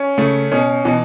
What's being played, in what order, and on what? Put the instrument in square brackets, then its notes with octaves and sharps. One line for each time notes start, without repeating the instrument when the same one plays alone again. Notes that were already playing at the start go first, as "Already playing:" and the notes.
Already playing: [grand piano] C#4
[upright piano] C#3 [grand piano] A3
[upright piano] B2 [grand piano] C#4
[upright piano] B2 [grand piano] E3